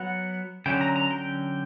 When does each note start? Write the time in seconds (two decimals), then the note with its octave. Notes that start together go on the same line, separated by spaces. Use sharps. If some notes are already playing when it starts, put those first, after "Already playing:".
Already playing: F#3 B3 F#5
0.66 D3 F#3 C#4 G5
0.81 A#5
0.96 A#5
1.11 G5